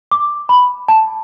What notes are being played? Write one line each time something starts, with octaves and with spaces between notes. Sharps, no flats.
D6
B5
A5